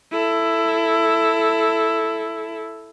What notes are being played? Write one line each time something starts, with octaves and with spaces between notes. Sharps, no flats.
E4 A4